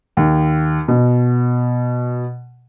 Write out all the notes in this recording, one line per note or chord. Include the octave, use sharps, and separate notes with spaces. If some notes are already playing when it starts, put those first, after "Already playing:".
D#2
B2